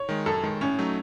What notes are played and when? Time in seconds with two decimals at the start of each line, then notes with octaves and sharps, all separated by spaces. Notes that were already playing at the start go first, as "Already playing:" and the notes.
Already playing: C#5
0.09 D#3 G#3
0.26 F#2 A4
0.43 D#3 G#3
0.61 A2 C#4
0.78 F#3 A3 D#4